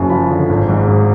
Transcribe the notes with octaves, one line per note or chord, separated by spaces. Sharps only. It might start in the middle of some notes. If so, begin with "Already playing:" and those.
Already playing: F#1 F#2 A5
F3 B5
D3
G#1
G#2
G#1